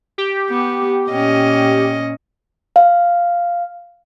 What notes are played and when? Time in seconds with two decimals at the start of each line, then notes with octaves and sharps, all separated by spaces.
0.18 G4
0.50 B3
1.10 A#2 C#4 D#5
2.76 F5